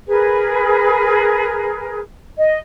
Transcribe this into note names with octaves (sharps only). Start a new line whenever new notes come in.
G#4 A#4 B4
D#5